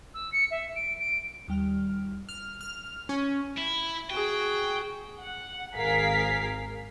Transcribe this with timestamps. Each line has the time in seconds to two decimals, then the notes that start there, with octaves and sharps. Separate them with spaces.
0.14 E6
0.32 C#7
0.51 E5
0.76 D7
1.00 D7
1.48 D#2 G3 F6
2.29 F6
2.61 F6
3.09 C#4
3.58 E4
4.10 F#4 G#4 G5
5.20 F#5
5.75 G#1 G#4 A#4 F5 B6 C7